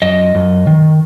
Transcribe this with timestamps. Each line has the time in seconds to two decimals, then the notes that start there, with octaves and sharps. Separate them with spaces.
0.02 F#2 D#5
0.35 F#2
0.67 D#3